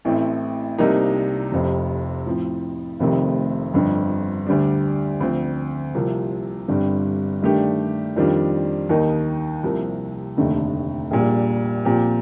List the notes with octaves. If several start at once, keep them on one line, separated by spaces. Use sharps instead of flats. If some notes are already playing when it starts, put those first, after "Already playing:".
A1 A2 A3 C4
C2 C3 G3 A#3 D#4
F1 F2 C3
A2 F3 C4
F1 F2 C3 D#3 A3
G1 F2 D3
D2 D3 G3 D4
D2 D3 F3 C4
C2 C3 F3 A#3 F4
G1 G2 D3 G3 C4
G2 D#3 A3 D4 G4
F2 D#3 G3 D4 F4
D#2 D#3 A#3 D#4
C2 C3 F3 A#3
F1 D#2 D3 A3 D#4
A#1 A#2 G3
A#2 F3 C4 G4